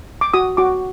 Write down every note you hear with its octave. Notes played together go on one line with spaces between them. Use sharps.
D6
F#4 D#6
F#4 D6